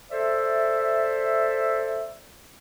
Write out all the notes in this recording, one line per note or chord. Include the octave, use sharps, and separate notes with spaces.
A4 C5 D5 E5